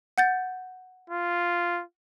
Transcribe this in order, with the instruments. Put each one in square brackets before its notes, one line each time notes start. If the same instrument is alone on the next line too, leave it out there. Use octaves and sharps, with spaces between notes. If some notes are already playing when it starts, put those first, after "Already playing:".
[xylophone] F#5 G6 A6
[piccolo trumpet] F4